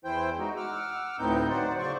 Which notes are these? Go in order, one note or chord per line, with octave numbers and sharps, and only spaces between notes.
E2 E3 E4 C5 G5 G6
G#3 D#4 F#4
F#5 D6 E6 F6
D2 A2 B3 C4 D#4 G6
F#3 C5 D5 F#5
C#3 F#3 C5 D5 C#6